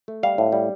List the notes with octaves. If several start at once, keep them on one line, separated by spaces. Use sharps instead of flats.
A3
G3 F5
A2
G3